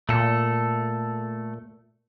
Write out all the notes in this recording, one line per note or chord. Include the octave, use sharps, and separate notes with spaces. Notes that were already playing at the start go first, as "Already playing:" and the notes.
A#2 A3 A4